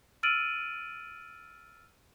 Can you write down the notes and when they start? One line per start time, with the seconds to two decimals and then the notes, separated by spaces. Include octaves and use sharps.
0.23 E6 F6 A6 D7 D#7 F#7